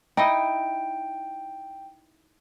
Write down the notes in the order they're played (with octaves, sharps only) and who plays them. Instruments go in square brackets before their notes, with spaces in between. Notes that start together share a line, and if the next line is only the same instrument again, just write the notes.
[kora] D#4 E4 D#5 [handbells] G5